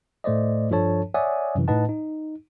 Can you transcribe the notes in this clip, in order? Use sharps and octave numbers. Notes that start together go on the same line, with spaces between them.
A2 A3 C5 D5 D#5
G2 F3 D4 A4 C#5 A5
C#5 D5 E5 F#5 G#5 D#6
F#2 C3 E3
A2 D#4 B4 D#5 F#5 A5
D#4